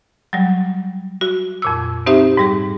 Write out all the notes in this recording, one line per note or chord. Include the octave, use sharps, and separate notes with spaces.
F#3 G3
F#4
F2 A#2 E6
C4 D#4 G4 C5 E5
G#2 G3 G#4